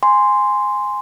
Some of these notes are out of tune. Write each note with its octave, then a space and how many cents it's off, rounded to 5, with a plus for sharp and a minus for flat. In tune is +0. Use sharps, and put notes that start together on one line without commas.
G#5 -5 C6 -5